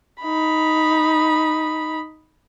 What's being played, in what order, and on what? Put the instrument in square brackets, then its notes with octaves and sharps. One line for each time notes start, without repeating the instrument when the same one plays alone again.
[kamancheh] D#4 B5